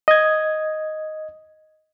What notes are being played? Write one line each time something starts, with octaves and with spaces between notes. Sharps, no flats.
D#5 G#6